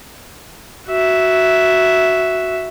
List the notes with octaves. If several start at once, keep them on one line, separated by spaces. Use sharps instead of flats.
F#4 E5